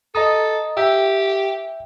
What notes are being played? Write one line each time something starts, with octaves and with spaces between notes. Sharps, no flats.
A4 D#5 A#5 D#6
G4 E5 G5